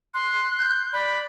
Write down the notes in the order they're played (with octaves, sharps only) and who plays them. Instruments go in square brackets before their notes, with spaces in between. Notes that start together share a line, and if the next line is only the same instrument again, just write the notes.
[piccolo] C6 [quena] F#6
[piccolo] G6
[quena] D5 [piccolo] B5